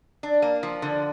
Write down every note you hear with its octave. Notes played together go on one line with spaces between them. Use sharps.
D4
A#3
F3
D3